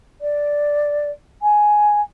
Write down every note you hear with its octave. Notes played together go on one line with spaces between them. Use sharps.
D5
G#5